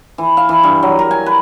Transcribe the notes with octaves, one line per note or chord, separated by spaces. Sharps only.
E3
F5
E3
G2
F#3
A#4
G#5
B4